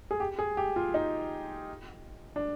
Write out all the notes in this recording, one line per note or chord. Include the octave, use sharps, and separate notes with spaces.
G#4
G4
G#4
G4
F4
D#4
D4